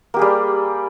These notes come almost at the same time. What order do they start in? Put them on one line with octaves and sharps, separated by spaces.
A#3 G4 G#4 G3